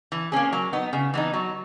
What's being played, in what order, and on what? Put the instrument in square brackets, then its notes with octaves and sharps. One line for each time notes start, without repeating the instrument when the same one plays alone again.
[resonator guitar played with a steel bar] E3
A#3 C#4 G#4
F#3
B3 D#4
C#3
E3 B3 D#4
F#3